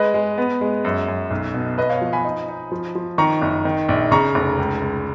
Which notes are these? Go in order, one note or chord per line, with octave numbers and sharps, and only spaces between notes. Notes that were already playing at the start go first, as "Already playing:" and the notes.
Already playing: G#3 B4 D#5
G#3
B3
G#3
F#2
F#2
B1
B2
B3 B4 D#5
C#5 F5
F3
G#5 B5
D#4
D#4
F3
F3
D#3 A#5 C#6
F#1
D#3
A#1
C#3 A#5 C#6
F1
C#2
C#2